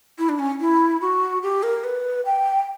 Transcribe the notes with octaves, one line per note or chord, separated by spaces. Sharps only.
E4
D4
C#4
E4
F#4
G4
A#4
B4
G5